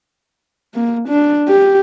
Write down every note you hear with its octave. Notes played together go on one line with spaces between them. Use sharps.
A#3
D4
G4